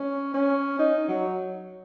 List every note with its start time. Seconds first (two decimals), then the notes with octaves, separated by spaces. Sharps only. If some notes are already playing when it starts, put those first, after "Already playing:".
Already playing: C#4
0.34 C#4
0.79 D#4
1.08 F#3